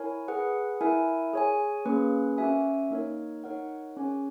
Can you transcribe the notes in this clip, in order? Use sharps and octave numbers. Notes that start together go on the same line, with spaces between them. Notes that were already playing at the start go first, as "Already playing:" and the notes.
Already playing: E4 A#4 C#5 G#5
G#4 B4 F#5
E4 A#4 E5 G#5
G#4 C#5 G#5
A#3 C#4 G#4 B4
C#4 F#4 A#4 E5 G#5
A#3 D#4 A#4 C#5
D#4 A#4 C#5 F#5
C#4 G#4 C#5 G#5